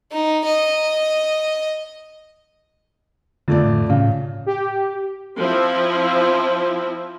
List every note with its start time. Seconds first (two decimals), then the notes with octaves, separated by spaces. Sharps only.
0.12 D#4
0.45 D#5
3.48 F2 D3 A3 D5
3.66 A2
3.90 A2 C#3
4.46 G4
5.38 F3 C4 E4